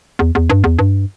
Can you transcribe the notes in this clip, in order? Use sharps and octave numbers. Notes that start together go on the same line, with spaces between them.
E2
E2
G2
E2
G2